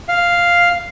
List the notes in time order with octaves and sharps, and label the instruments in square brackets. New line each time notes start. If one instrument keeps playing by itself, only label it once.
[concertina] F5